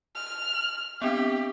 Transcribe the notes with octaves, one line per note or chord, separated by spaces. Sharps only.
F6
F7 F#7
B3 C4 D4 G4